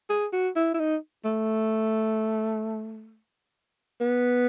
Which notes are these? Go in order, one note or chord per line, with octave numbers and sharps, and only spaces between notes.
G#4
F#4
E4
E4
D#4
A3
B3